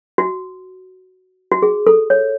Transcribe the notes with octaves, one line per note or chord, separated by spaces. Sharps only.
F#4
F#4
G#4
A4
C#5